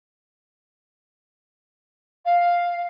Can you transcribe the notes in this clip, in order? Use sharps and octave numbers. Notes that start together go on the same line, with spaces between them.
F5